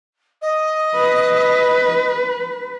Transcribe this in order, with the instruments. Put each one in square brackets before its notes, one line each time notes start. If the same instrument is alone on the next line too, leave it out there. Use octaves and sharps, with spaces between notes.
[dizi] D#5
[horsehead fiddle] B4